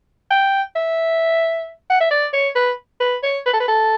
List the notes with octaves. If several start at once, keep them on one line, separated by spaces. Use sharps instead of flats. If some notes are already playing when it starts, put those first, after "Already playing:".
G5
E5
F#5
E5
D5
C#5
B4
B4
C#5
B4
A4
B4
A4